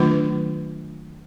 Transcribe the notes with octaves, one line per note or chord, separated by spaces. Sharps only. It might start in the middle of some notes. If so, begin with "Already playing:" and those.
Already playing: D#3 F#3 A3 D4 F4